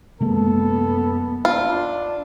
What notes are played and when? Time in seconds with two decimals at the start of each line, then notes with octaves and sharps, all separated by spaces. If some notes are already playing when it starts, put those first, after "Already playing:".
0.20 F#2 C3 G#3 A#3 B3 A4
1.45 D4 F4